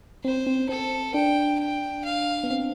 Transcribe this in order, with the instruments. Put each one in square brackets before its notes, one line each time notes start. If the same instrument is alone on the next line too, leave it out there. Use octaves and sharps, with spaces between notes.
[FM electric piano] C4 [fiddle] C5
[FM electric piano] C4
[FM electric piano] C4 [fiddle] A4
[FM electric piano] D4 [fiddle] G5
[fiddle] G5
F5
[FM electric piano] B3
C4